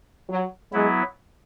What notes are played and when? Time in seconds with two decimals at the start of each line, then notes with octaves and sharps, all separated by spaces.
0.29 F#3
0.72 F#3 G#3 B3 E4